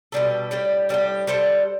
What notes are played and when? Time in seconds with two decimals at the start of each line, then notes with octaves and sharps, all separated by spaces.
0.12 B2 G3 D4 A4
0.51 A2 G3 D4 G4
0.89 A2 G3 D4 G4
1.27 G3 D4 A4 C5